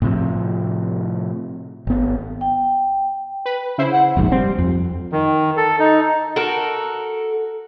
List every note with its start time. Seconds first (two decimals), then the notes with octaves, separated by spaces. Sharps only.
0.02 A2 C3 F3
1.87 G#1 B3
2.41 G5
3.46 B4
3.78 C#3 E4 C5
3.92 F#5
4.17 F1 A#1 G#2
4.32 G3 C4
4.59 F2
5.12 D#3
5.57 A4
5.79 D#4
6.36 F#4 A4 A#4